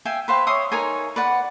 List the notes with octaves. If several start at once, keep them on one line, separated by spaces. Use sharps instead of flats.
E5 F5 G5 G#5
B4 C5 F5 G5
C#5 E5 C6 D#6
D#4 A#4 C#5 G#5
B4 D5 F#5